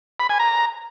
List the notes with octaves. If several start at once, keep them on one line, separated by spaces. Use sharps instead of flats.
B5
G#5
A#5